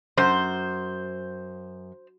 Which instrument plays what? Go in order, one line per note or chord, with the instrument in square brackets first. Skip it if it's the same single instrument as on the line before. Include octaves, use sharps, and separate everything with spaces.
[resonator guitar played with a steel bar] F#2 [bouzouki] C5